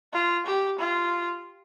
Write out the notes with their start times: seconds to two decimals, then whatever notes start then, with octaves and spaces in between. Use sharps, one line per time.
0.14 F4
0.47 G4
0.79 F4